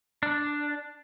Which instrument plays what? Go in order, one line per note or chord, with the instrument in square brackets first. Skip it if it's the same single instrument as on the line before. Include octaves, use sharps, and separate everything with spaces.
[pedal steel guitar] D4